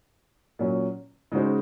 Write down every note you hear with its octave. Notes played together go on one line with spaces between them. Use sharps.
A#2 F#3 C#4
C#3 G#3 D#4 F#4 C5